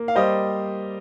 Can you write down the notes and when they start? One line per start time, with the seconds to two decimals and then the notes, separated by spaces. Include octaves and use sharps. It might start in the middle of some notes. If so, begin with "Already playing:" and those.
Already playing: A#3
0.08 F5
0.16 G3 C5 D#5